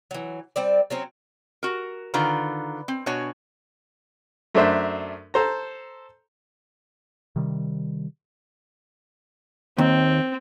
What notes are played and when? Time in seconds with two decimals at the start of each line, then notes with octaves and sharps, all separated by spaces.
0.11 E3 F#3
0.56 G3 C4 D5
0.90 F#3 C4 C#4
1.63 F#4 A#4
2.14 D3 D#3 F4 B4 A#5
2.88 C4
3.06 B2 D4 F#4 C#5 G#5
4.55 F#2 A3 D4 C5 E5
5.34 A4 C5 A#5
7.36 C3 D#3 G3
9.78 D#2 C4